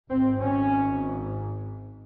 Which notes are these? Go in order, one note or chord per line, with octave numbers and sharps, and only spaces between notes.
G#1 G#2 C4
C#4